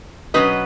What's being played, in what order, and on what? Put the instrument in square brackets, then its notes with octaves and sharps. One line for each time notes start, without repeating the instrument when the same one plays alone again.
[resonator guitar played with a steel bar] B2 F#3 C#4 B4 D#5